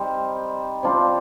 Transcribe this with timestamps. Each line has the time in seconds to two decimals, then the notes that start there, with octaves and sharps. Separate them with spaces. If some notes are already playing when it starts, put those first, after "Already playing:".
Already playing: G3 C4 D#4
0.83 C3 G3 D4 F4